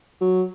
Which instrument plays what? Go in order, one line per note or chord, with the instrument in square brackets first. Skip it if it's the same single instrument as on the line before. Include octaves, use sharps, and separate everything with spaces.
[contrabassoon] F#3